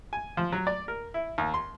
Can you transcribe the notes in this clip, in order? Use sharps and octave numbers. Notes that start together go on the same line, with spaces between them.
G#5
F3
F#3
D5
A#4
E4
D#2
C6